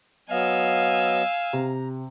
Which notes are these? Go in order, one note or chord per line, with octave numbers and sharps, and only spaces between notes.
F#3 B3 D#5 F5 G#5 E6
C3 A#5